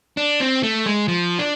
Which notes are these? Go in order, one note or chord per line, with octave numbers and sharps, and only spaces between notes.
D4
C4
A3
G#3
F3
D4